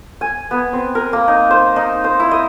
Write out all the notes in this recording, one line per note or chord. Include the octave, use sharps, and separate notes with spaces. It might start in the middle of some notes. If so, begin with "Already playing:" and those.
G#5
B3
C4
A#4
A#3
D#4
C5
D#4
C5
E4
D#5